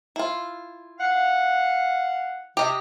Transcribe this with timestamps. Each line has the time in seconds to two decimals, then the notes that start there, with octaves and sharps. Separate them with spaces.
0.16 E4 F4
0.99 F5 F#5
2.57 C3 G4 D#5